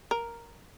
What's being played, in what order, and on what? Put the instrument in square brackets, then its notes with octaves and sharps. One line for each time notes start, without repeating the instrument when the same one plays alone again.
[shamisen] A#4